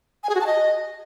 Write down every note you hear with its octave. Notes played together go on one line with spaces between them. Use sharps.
G#5
G#4
F#4
A5
D#5